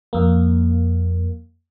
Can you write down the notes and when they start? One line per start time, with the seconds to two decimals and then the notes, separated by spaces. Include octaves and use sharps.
0.13 F2 A#3